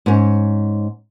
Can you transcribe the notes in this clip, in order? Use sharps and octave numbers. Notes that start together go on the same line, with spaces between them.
G#2 C#4